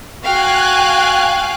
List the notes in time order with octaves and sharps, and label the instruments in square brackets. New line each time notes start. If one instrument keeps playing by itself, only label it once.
[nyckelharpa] F#4 [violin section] F5 G5 [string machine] G#5 F#6